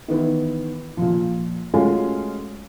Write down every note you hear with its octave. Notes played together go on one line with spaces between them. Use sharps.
D#3 E3 B3 E4
A#2 F3
G#3 A3 C#4 F4 F#4